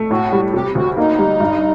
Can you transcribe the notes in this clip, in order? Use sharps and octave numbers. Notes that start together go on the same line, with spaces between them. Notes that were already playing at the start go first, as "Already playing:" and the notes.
Already playing: A3
A2 F#4
G3
C3 G4
D2 F#4
A#3 D#4
G3
G2